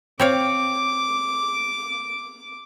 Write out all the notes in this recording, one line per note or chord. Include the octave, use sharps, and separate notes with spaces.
C4 C#5 F5 D6